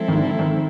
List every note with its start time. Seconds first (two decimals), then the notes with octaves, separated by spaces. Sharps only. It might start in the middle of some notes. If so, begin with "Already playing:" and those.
Already playing: F3 G#3 C4 E4 A4
0.08 D#3
0.15 D3
0.39 D#3